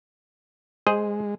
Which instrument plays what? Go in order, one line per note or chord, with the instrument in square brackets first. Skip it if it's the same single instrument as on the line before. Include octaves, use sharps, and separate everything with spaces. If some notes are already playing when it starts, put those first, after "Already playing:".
[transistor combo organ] G#3 [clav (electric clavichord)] G#4 C5 D#5